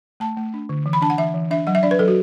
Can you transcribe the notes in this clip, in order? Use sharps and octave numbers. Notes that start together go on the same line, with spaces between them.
A3 A5
A3
D4
D3
E3
B5
D4 A5
F#5
E3 E5
E3
D4 E5
F#3 F#5
E5
D4 D5
B4
F#3 A4
F#4